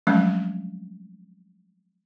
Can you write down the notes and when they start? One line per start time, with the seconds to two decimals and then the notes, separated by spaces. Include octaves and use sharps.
0.07 F3 F#3 G#3 A3 C4 C#4